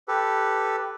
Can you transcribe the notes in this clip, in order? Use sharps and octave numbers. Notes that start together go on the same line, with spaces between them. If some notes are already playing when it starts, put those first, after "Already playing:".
G4 A4 B4